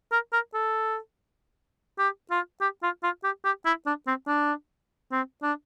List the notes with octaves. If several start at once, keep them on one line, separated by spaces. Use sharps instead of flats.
A#4
A#4
A4
G4
F4
G4
F4
F4
G4
G4
E4
D4
C4
D4
C4
D4